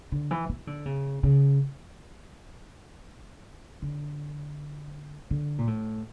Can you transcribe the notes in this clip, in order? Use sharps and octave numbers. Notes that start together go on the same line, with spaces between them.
D3
E3
E3
D3
C#3
C#3
D3
D3
A#2
A2